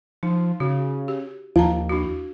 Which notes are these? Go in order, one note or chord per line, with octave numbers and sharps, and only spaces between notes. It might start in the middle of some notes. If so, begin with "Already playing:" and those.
F3 D#4
C#3 F#4
G4
D#2 F3 F5 A5 A#5
D4 E4 F#4